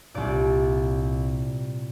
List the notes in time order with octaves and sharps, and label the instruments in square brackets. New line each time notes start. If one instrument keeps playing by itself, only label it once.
[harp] C2 A#2 D5